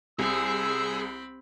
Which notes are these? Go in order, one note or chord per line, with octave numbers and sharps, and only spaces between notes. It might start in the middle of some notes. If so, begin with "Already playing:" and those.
C2 C4 G#4 B5 E6